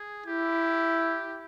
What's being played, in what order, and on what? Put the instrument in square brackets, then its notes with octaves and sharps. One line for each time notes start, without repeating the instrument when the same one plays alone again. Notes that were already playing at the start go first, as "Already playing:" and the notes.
Already playing: [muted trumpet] G#4
[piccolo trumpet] E4 [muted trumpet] G4